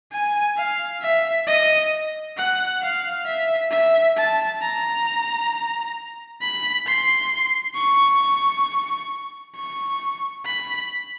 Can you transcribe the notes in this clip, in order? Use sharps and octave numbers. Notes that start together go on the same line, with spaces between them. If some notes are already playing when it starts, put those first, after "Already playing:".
G#5
F5
E5
D#5
F#5
F5
E5
E5
A5
A#5
B5
C6
C#6
C#6
B5